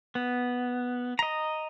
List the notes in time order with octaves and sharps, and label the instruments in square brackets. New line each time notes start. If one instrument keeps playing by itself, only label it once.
[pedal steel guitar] B3
D#5 A#5